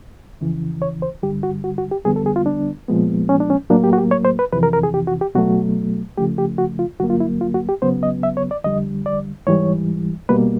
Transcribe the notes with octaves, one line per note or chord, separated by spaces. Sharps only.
F2 C#3 E3
C#5
C5
G2 D3 G3 G4
F#4
F#4
F#4
G4
F2 D3 G3 B3 G#4
A4
G#4
F4
D4
A#2 F3 G#3 B3
C#4
D4
C#4
A2 F#3 A#3 D4
G4
F#4
G4
C#5
C5
B4
F2 C3 E3 B4
A#4
A#4
G#4
G4
F#4
G4
B2 F#3 A3 F#4
C#3 F3 A3 G4
G4
F#4
F4
G2 D3 F#3 A#3 F#4
F4
E4
F4
F#4
G4
C#3 F#3 B3 C5
D#5
E5
C#5
D5
F2 D3 G3 D#5
D5
G#2 E3 G3 C#5
B2 G3 A#3 B4